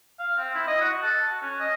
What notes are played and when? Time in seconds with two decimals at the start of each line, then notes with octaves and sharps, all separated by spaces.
0.19 F5
0.38 C4
0.55 E4
0.67 D#5
0.81 F#4
1.03 A4
1.28 F#4
1.42 C#4
1.60 D#5